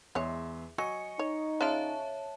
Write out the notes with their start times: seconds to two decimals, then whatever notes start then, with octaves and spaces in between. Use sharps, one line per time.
0.15 E2 E3 G#3 C#5 E5 C6
0.78 F#3 D#5 G#5 C#6 C#7
1.19 D#4 C#5
1.61 C#3 F4 C#5 E5 A5